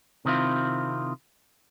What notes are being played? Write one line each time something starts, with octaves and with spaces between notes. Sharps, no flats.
C3 D#3 C4 E4 F4